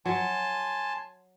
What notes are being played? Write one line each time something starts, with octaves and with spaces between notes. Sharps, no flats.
F#3 G#5 A5 C6